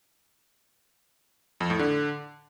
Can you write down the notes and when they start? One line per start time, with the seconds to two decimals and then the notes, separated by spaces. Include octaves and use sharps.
1.60 F2
1.70 A2
1.79 D3